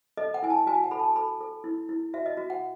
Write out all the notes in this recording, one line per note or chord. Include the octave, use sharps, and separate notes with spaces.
A4 D#5
F#5
E4 G#5
A5
F#4 G#5
F#5
A4 B5
A5
A4 B5
A4
E4
E4
F#4 E5
D#5
F#4
F#5